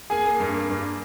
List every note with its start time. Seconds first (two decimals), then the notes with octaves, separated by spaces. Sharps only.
0.10 A#3 G#4 G#5
0.26 A#3
0.40 G2
0.54 A#3
0.69 G2